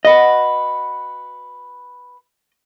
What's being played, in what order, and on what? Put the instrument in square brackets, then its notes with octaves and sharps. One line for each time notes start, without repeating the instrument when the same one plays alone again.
[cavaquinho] F#4 B4 F#5 [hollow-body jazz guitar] D#5